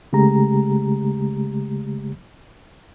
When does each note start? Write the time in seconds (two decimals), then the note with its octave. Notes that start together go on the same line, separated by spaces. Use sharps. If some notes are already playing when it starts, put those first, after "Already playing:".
0.13 C#3 G#3 A3 G4 A#5